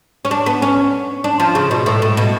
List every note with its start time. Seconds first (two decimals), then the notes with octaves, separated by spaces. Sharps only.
0.25 C#4
0.31 D4
0.46 B3
0.62 C#4
1.24 D4
1.40 F3
1.55 C#3
1.71 B2
1.86 A2
2.02 A2
2.17 B2